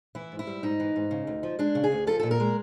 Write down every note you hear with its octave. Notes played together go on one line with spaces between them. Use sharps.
E3 E4
G#2
E4
G3
G#2 D#4
E3
G#2
C#3
D2
F3
G#3 D4
C#3
G#4
D2
F3 A4
A#2 A4
A#4
G#3